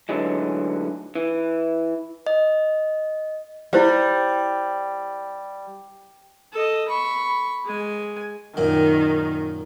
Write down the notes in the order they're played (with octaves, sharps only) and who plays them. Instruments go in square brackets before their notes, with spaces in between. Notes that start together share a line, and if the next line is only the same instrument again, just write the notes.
[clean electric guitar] D2 D3 E3 F#3 G#3
E3
[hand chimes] D#5
[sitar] G3 [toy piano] E4 C5 F5
[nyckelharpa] A4 D#5
B5 C#6
G#3 G#5
[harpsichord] F#2 A#2 [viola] D#3